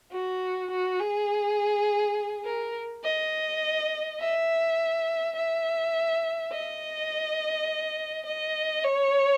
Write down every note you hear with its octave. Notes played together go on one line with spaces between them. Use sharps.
F#4
F#4
G#4
A#4
D#5
E5
E5
D#5
D#5
C#5